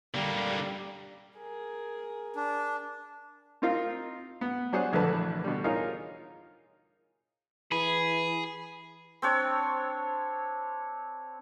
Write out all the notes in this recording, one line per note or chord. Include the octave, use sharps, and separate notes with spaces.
D3 G3 A#3
G#4 A#4
D4
C4 D#4 F4 A#4 F5
B3
F#3 D4 G#4 C5 C#5 F#5
A#1 E2 D3 A3 B4 A5
B2 D3 G3
D#4 F4 G#4 A#4 C#5 F5
E3 G#4 B5
C4 D4 C#5